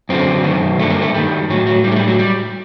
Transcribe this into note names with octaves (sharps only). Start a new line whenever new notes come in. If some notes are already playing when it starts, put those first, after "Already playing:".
F#2 D3 C4
F#2 D#3
G2 D3 A3
A#3
A3
G2 D#3 G3
A2 F#3
F#3
A2 G3
A3
G3
F#3
G3